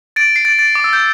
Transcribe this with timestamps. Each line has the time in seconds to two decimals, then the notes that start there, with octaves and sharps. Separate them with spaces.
0.16 A6 D7
0.36 C7
0.45 A6 D7
0.59 A6 D7
0.75 D6
0.84 E6
0.93 G6